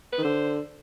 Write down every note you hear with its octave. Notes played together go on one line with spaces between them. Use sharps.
D#3 B4
D3 C5